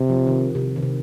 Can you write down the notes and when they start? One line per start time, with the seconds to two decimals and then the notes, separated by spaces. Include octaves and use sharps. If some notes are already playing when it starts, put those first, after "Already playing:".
Already playing: C3
0.10 F3
0.27 D#3
0.55 C3
0.76 D#3
0.83 C3